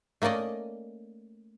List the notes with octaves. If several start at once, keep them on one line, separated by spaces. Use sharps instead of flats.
A3 A#3 C#4 D5 D#5